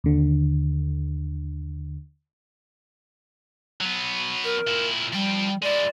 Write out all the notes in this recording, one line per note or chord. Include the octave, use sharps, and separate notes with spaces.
D#2 D3
F#3 B3
A#4
A#2 E4
F3 G3 G5
G#3 E4 D5